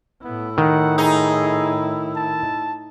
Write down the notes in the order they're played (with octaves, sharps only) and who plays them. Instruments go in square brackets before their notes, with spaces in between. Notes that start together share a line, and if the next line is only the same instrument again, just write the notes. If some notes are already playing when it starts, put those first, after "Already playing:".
[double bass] A2 E4 [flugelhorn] B3
[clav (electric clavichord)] D#3 [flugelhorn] F#5
[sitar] D#4 [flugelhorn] G#4
[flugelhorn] A5